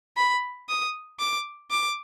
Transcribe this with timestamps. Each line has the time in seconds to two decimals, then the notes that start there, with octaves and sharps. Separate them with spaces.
0.17 B5
0.69 D#6
1.19 D6
1.70 D6